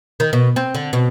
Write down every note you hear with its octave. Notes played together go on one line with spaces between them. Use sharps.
D#3
B2
C4
D3
B2